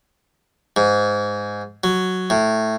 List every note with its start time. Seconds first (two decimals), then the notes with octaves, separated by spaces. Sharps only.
0.77 G#2
1.84 F#3
2.30 A2